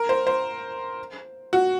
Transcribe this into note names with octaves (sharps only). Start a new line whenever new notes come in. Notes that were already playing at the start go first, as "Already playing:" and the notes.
Already playing: A#4
C5
C5
F#4